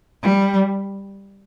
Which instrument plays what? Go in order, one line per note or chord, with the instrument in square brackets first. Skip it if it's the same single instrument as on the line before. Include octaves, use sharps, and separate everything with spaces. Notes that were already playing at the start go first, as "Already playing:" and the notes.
[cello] G3